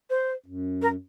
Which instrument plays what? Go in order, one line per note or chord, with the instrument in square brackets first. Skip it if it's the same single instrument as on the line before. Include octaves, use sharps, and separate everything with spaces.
[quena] C5
[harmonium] F#2
[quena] A#4